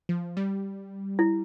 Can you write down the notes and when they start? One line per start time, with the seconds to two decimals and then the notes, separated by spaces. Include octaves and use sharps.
0.09 F3
0.37 G3
1.19 E4